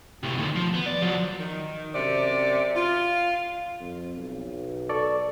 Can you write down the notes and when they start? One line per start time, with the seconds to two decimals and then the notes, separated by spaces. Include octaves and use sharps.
0.23 A2 C3
0.38 D2 D#3
0.56 F3
0.74 B3
0.86 D5
1.02 F3 F#3
1.39 D#3
1.94 F#2 C3 D5
2.75 F4
3.80 F2
4.17 B1
4.89 A4 D5 C#6